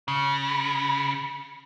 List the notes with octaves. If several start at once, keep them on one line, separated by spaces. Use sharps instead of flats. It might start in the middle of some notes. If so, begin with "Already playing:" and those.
C#3